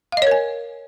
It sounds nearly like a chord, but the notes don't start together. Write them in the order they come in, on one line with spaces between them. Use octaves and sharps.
F5 D#5 C#5 A#4 G#5